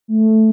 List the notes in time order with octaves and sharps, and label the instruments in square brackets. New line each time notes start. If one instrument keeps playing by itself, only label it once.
[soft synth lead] A3